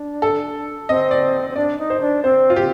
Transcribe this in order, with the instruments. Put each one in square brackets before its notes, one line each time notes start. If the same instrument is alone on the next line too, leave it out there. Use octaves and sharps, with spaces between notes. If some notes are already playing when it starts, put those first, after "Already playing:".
Already playing: [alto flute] D4
[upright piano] A4
[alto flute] C4 [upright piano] D#5
[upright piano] D5
[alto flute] C4
[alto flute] D4 [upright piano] D5
[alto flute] D#4
[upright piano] C5
[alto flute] D4
[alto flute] C4 [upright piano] C5
[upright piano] F4
[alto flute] C4 [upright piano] G4